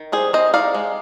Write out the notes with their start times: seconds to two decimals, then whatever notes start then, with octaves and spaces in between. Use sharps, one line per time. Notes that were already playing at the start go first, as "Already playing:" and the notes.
Already playing: D#3
0.12 G3 G#4 C5
0.33 C4 C5 D#5
0.54 D#4 D5 F5
0.74 G#3